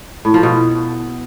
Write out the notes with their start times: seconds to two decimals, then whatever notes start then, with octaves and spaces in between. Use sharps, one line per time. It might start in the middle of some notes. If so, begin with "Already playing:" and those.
0.25 A2
0.34 F3
0.43 B2